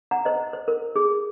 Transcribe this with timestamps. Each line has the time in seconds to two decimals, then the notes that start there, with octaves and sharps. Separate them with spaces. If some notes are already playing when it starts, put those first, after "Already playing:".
0.11 F#5 A#5
0.25 C5 D#5
0.53 C5
0.68 A#4
0.96 G#4